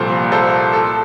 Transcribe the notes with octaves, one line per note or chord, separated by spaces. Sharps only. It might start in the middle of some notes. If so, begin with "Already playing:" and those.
Already playing: C2 A#2 F3 A4 C5
A4 C5
A4